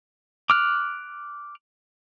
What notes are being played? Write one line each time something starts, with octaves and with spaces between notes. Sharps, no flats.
D6 F6 F#6